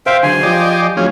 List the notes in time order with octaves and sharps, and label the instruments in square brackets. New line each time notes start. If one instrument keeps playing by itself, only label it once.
[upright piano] C5 [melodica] E5 F5 G5
[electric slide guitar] D3 F#3 G#4 [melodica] G#5 C6
[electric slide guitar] F3 F4 [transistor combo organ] G4 D5 D#5
[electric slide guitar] A2 F#3 [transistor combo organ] C#4 F4 G#4